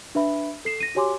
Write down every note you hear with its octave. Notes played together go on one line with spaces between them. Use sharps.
D4 B4 E5 B5
A4 C7 E7
A#6 D#7
F#4 G4 C#5 G#5 C6 D6